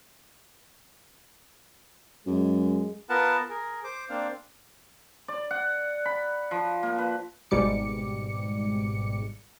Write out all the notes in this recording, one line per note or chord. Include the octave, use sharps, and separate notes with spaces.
F#2 G#3
B3 F4 A#4 B4 F#5 A5
G#4 A#4
C5 D6
A#3 C4 D4 C5 F5
D5
F#5
B5
F3
A#3
B4
G#1 G#2 B2 G3 D6 C#7